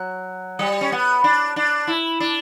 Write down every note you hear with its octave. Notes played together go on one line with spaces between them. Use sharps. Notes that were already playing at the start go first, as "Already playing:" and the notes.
Already playing: F#3
G3
C#4
B3
D4
D4
E4
D4